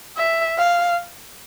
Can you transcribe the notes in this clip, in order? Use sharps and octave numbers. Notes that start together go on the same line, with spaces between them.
E5
F5